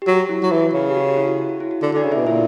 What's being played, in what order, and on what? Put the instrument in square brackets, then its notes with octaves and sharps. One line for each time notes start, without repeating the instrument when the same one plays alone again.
[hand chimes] G4
[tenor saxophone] F#3 [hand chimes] F#4
[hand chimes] E4
[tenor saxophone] F#3
[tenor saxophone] E3 [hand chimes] E4
[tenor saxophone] C#3
[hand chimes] G4
F#4
E4
F#4
F#4
F#4
E4
F#4
[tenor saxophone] D3
D3
[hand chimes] D4 D5
[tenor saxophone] C#3
[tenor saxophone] B2 [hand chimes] E4 E5
[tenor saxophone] A#2 [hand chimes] E4 E5